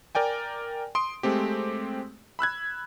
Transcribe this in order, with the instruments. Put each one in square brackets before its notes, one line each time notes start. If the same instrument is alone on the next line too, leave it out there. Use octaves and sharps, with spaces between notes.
[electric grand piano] A#4 D5 G5 G#5
C6 D#6 D7
G#3 A3 C4 G4
B5 E6 F#6 G#6